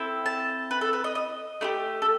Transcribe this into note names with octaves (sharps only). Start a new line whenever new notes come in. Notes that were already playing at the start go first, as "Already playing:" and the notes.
Already playing: C4 E4 A4
A5
B4
A4
B4
D#5
D#5
A3 E4 G4
A4